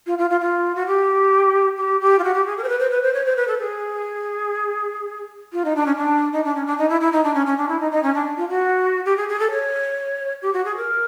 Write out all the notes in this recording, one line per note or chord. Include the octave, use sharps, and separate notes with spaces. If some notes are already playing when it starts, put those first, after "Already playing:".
F4
F4
F4
F4
F#4
G4
G4
G4
F4
F#4
G4
G#4
A#4
C5
B4
C5
B4
C5
C#5
C5
B4
A4
G#4
F4
D#4
D4
C#4
D4
D#4
D4
C#4
D4
D#4
E4
E4
D#4
D4
C#4
C#4
D4
E4
D#4
D#4
C#4
D4
F4
F#4
G4
G#4
G#4
A4
C#5
G4
F#4
G#4
A#4